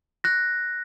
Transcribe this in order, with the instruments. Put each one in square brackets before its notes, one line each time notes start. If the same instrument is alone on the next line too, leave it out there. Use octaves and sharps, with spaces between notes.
[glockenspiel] F#6 A#6